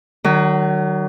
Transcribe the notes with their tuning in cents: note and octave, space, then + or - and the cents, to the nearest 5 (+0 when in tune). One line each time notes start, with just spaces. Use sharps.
D#3 -30 F#3 +30